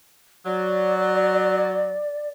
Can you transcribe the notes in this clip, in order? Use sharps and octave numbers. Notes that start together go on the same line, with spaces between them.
F#3 D5